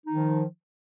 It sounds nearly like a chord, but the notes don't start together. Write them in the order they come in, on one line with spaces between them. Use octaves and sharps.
D#4 D#3 F3